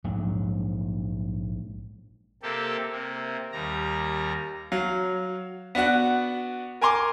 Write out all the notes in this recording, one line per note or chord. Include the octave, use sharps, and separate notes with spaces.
A#1 G#2 F#3
C3 A#3 G4 A4
C3 A#3
D#2 G3 A#5
F#3 F5
B3 D4 F#4 F#5
A#4 G#5 A#5 C6 D6